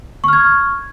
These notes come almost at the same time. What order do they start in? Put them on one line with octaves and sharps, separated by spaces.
C#6 F6 G#6